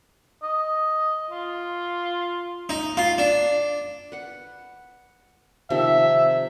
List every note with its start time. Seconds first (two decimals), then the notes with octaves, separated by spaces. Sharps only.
0.43 D#5
1.31 F4
2.69 D#4
2.97 F4
3.18 D4
4.12 B4 F#5
5.70 C3 D#3 F3 E5